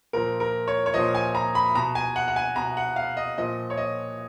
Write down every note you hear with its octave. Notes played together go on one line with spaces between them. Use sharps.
A#2 F3 A#4
A#4
C#5
C#5
A#2 F3 D#5
G#5
A#5
B5
B2 A#5
G#5
F#5
F#5
G#5
B2 A#5
F#5
F5
D#5
A#2 F3 D#5
C#5
D#5